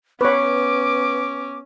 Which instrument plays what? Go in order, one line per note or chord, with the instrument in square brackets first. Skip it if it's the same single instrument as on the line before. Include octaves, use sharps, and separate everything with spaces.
[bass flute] B3 [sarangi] C#4 [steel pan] B4 C#5 [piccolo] D6